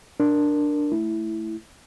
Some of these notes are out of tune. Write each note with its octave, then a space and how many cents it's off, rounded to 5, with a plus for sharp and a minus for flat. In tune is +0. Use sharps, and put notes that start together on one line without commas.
D4 +5 A#4 +0
A3 +0 E4 +0